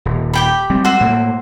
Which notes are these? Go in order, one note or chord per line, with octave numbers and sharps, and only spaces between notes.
D#1
G4 G5 B5
G3 G#3 C4
F#4 C5 E5
A2 A#3